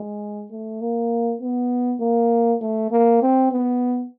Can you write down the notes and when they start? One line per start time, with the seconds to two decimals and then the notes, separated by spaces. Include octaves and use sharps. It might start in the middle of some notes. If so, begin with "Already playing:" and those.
Already playing: G#3
0.51 A3
0.81 A#3
1.41 B3
2.01 A#3
2.61 A3
2.91 A#3
3.22 C4
3.52 B3